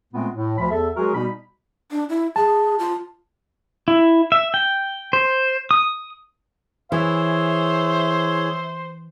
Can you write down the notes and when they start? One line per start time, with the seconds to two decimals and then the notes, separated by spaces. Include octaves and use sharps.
0.13 A#2 G#3 A3 B3 C4
0.34 A2
0.58 D2 F3 B5
0.70 E2 A4 E5
0.97 F#3 G#3 F#4 G#4 A#4
1.15 B2 G3 B3 D#4 B5
1.91 D4
2.09 E4
2.36 G#4 A5
2.79 F4
3.88 E4
4.32 E5
4.54 G5
5.13 C5
5.71 D#6
6.92 E3 G#4 C5 C#5 E5